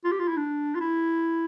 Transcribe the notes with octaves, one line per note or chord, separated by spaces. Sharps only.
F4
G4
F4
E4
D4
F4
E4